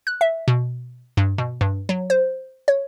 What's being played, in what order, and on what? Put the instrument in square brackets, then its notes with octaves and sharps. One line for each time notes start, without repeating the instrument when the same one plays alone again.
[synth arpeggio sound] F#6
E5
B2
G2
B2
G2
F#3
C5
C#5